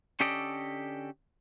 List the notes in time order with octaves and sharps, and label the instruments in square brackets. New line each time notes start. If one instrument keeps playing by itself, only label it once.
[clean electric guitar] D3 C#4 G4 A4 D5 D#5